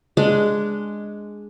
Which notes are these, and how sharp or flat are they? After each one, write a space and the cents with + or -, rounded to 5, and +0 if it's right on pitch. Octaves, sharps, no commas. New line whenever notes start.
G#3 +0 D4 +0